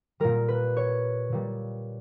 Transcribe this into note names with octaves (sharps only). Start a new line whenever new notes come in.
A#2 G3 A#4
B4
C#5
A#2 G3